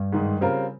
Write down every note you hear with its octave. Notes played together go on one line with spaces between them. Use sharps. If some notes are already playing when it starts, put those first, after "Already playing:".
Already playing: G2
G#2 D#3 G#3
C#3 G3 C4 F4 A#4